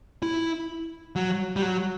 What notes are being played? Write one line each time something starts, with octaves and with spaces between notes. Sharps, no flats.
E4
F#3
G3
F#3